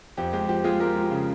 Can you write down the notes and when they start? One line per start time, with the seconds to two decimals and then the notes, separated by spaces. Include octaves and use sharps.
0.17 F2 G4
0.33 G#3 G4
0.48 F3 G4
0.64 G#3 F4 G#4
0.80 G#3 G4 A#4
0.96 F3
1.11 C#3